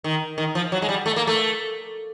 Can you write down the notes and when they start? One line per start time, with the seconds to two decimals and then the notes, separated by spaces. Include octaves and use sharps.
0.04 D#3
0.38 D#3
0.55 F3
0.72 F#3
0.82 G#3
0.89 G3
1.06 A3
1.16 A#3
1.27 A3